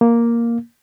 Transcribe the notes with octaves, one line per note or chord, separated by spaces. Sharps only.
A#3